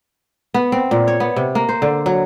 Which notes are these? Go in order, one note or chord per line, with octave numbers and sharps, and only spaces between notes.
B3
C4
A#2
C#5
B3
C3
A#3
C5
D3
F#3